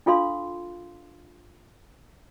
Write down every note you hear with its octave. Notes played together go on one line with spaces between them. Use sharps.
D4 F4 A4 F5 C6